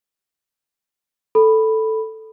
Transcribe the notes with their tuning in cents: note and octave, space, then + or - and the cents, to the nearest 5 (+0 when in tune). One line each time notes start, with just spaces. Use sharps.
A4 +0 B5 +0